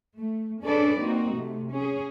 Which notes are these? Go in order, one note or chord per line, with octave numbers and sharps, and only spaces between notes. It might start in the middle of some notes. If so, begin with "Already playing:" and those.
A3
C#4 D4 G#4 A4 B4 D5
A#3 C4 D#4 F#4
C3 A3
C#4 G#4